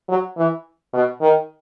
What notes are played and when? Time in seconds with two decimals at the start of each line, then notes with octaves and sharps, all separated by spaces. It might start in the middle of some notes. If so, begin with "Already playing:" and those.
0.09 F#3
0.37 E3
0.94 B2
1.22 D#3